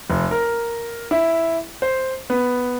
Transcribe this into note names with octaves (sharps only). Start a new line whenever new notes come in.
F1
A#4
E4
C5
B3